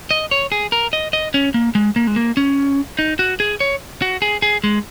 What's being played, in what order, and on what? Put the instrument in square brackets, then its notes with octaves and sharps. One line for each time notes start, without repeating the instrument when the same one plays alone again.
[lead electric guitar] D#5
C#5
G#4
A#4
D#5
D#5
C#4
A#3
G#3
A#3
G#3
A#3
C#4
D#4
F#4
G#4
C#5
F#4
G#4
G#4
G#3